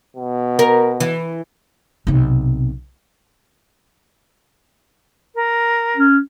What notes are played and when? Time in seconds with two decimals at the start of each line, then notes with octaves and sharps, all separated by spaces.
0.16 B2
0.59 A#4
1.00 E3
2.07 B1 C3
5.35 A#4
5.97 C#4